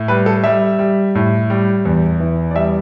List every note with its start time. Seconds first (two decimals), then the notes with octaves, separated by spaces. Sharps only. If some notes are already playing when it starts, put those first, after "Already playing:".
Already playing: A2
0.08 G3 B4
0.26 A4
0.44 G3 E5
0.79 G3
1.15 A2
1.50 G3
1.85 E2
2.20 E3
2.51 D5
2.55 G3 E5